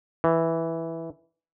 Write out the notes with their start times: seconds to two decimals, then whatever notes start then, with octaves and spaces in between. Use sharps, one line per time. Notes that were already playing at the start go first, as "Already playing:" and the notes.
0.24 E3